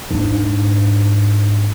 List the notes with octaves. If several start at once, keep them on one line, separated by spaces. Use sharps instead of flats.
G#2 D4